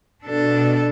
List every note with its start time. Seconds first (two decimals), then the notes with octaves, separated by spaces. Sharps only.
0.24 B2 D4 A4